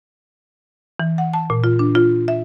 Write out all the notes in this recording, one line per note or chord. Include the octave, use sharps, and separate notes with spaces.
E3
F#5
A5
A#2
F4
D4
F4
E5